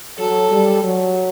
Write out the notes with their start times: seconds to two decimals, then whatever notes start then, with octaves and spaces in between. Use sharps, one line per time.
0.18 F#3 A4
0.51 G3
0.84 F#3